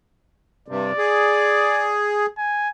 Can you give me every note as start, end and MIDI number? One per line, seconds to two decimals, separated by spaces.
0.68 0.92 43
0.68 0.92 48
0.68 1.97 74
0.98 2.26 68
2.38 2.69 80